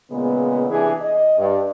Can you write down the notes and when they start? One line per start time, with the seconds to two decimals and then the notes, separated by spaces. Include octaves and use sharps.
0.11 A#2 C#3 G#3 B3
0.70 C3 E3 D4 G#4
1.01 D#5
1.38 G2